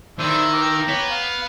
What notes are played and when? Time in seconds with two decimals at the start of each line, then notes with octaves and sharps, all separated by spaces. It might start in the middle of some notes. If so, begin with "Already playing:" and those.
0.19 D#3 D4 E4 C5 E6
0.54 G5 A#5 D6
0.88 B3 C#5
1.10 F5